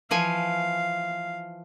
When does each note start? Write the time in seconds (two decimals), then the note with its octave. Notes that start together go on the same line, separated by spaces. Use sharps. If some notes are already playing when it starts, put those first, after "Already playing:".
0.11 E3 F3 F5 G#5